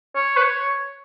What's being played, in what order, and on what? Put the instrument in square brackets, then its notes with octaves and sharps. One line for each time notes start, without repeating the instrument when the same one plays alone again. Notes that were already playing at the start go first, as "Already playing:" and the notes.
[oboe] C#5
B4
C#5